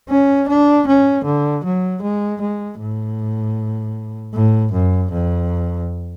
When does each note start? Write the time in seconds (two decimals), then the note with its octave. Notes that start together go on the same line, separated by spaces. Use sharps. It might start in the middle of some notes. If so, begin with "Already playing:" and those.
0.09 C#4
0.48 D4
0.87 C#4
1.25 D3
1.64 F#3
2.02 G#3
2.41 G#3
2.79 A2
4.34 A2
4.73 F#2
5.11 F2